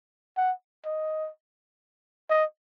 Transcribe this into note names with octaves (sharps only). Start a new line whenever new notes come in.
F#5
D#5
D#5